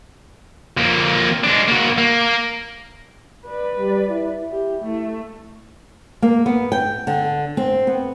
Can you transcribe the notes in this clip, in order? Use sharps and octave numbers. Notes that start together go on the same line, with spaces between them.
F2 A#3
G#3 D4
A#3 F#4
A#3
B4 D5
G3
E4
G4
A3
A#3
B3
G5
D3
C4
B3